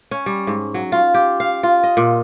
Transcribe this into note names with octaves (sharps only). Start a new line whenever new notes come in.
C#4
G3
G#2
F#3
F4
G4
F5
F4
D#5
A#2